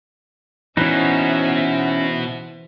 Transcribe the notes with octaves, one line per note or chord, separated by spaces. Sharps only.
B2 E3 C#4 D#4 C5 E5 F#5